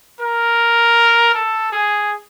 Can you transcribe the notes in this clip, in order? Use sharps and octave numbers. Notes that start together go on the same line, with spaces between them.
A#4
A4
G#4